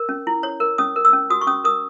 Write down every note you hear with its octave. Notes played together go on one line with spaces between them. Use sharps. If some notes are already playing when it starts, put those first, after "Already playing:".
Already playing: A#4
C#4
E4
C#5
A#4
C#4 D#6
A#4
E6
C#4
F#4 D#6
C#6
C#4 D#6
A#4 D#6